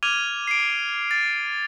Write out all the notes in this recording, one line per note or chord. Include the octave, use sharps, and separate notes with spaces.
D6 F6 G#6 D#7 F7 G7
C7 D7
A6